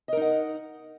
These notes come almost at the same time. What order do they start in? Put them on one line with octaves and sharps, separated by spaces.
D#5 A#4 D#4 F#5